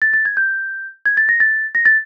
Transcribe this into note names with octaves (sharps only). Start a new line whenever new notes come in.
A6
A6
G#6
G6
G#6
A6
A#6
A6
A#6
A6